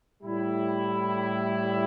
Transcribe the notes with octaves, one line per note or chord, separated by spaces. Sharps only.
A2 G3 E4